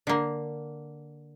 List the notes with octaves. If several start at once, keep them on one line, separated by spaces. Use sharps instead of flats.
D3 A#3